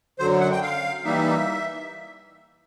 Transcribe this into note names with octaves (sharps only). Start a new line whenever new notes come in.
F#2 D3 F#3 C5
F#5
G5
F5
E3 G3 A#3 D#4 E5